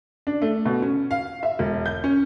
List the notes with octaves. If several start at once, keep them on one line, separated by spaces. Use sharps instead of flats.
D4
A3
B2
C#4
F5
E5
E1
G6
C#4